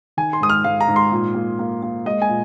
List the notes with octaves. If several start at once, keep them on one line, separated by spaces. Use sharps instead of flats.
D#3 G#5
C6
G#2 D#6
F6
G#2 F5
A#5
G#2
C6
A#2
A#3
A#3
A#3
G#3 D#5
G#5
A#2